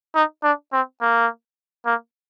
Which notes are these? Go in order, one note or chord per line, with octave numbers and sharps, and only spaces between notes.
D#4
D4
C4
A#3
A#3